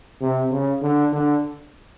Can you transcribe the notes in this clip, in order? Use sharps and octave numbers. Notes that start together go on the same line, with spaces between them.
C3
C#3
D3
D3